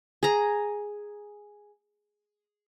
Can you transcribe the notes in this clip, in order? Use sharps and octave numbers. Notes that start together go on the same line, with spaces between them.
G#4 A#5